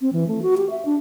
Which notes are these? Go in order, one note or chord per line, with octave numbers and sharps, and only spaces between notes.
C4
E3
A3
F#4
G4
E5
D4